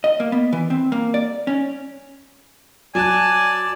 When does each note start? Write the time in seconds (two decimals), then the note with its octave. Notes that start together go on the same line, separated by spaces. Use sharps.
0.04 D#5
0.20 A#3
0.32 B3
0.53 E3
0.70 C4
0.92 A#3
1.14 D5
1.47 C#4
2.95 F#3 D5 G#5 A5 F#6